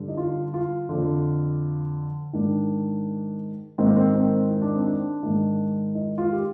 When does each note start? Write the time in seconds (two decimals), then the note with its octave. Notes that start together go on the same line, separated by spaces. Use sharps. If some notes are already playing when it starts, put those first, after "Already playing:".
Already playing: G2 D3
0.08 D#4
0.17 F4
0.54 F4
0.89 F2 D3
2.33 G#2 D#3 D4
3.78 G#2 D#3 C4
3.86 A#3
3.96 C4
4.15 C4
4.50 D#4
4.62 D4
4.75 C4
4.87 D4
5.23 G#2 D#3
5.95 D#4
6.18 F4
6.32 G4